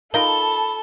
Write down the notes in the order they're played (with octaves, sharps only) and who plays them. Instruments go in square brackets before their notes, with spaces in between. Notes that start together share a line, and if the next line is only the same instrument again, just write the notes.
[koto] D#4 F4 A#4 [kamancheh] A4 A5 [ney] B5 [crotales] G7